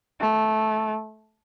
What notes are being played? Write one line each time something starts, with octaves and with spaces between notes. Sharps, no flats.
A3